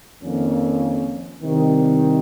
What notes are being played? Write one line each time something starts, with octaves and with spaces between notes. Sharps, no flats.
F2 D#3 A#3 C#4
C2 C3 D#3